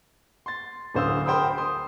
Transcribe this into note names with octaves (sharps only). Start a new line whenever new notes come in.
C6 A6
D1 D3 C5 F5 D#6 E6
A#4 C5 G5 B5 D#6
C6 D#6